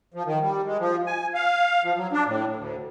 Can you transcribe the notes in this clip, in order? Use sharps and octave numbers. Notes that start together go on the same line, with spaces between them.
F3
D#3
G3
G#3
F3
G#5
F5
F3
F#3
D4
A2
D2